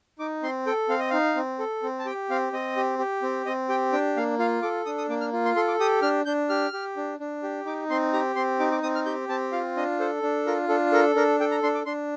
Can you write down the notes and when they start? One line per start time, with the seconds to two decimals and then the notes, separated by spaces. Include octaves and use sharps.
0.19 D#4 D6
0.43 C4 C6
0.66 A4 G5
0.89 C4 F5
0.99 D#5
1.10 D#4 F5
1.36 C4
1.59 A4
1.83 C4
1.99 A5
2.05 G4 G5
2.30 C4 F5
2.53 C4 D#5
2.76 G4
2.99 G4
3.23 C4
3.46 C4 D#5
3.69 G4 G5
3.92 D4 G5
4.17 A#3 F5
4.39 F4 F5
4.62 A4 D6
4.86 D4 D#6
4.98 D#6
5.09 A#3 D6
5.21 F6
5.33 F4
5.45 C6
5.56 A4 C6
5.68 D6
5.80 G4 D#6
6.02 D4 F6
6.26 D4 G6
6.49 G4 F6
6.73 G4
6.97 D4
7.20 D4
7.43 G4
7.66 D#4 D6
7.90 C4 C6
8.13 G4 A#5
8.36 C4 C6
8.59 D#4 D6
8.72 D6
8.83 C4 D#6
8.95 F6
9.06 G4 G6
9.29 C4 A5
9.52 F4 F5
9.77 D4 D#5
10.00 A4 C5
10.23 D4
10.46 F4 A#4
10.69 D4 A4
10.92 A4 A#4
11.16 D4 A#4
11.40 A4 G5
11.51 A#5
11.63 D4 C6
11.75 D6
11.86 D4 C6